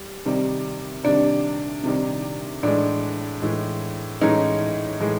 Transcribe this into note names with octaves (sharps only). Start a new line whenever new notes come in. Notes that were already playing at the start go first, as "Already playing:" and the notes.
Already playing: G3
C3 D#3 G3
C3 D#3 G3 D4
C3 D#3 G3
A2 E3 G#3 D4
A2 E3 G#3
A2 E3 G#3 C#4 D#4
A2 E3 G#3